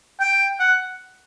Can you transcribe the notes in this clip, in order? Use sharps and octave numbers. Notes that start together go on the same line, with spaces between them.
G5
F#5